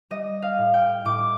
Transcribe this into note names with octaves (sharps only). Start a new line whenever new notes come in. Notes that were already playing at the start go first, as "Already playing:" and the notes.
G3 D#5
F5
A2
G5
A2 D6